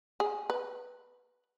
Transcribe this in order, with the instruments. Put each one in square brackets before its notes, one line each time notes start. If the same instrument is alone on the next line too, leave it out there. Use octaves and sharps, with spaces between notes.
[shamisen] G#4
B4